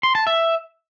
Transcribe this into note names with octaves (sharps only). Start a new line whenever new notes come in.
C6
A5
E5